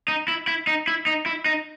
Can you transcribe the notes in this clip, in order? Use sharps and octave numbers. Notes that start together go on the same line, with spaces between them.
D#4
E4
E4
D#4
E4
D#4
E4
D#4